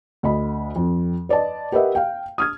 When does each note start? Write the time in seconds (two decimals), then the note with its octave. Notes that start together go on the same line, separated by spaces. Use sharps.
0.23 D2 D#5 B5
0.76 F2
1.29 B4 D5 D#5 A5
1.72 G4 A#4 B4 D#5 E5 F#5
1.95 F5 G5
2.38 D#6 F6 G#6